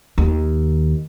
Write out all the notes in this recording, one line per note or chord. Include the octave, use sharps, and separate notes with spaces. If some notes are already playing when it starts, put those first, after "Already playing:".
D#2